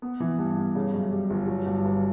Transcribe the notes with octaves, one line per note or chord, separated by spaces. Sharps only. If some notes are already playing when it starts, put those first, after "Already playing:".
B3
E3
G2
G2
C#3
F#2
G3
G1
F#3
G2
G1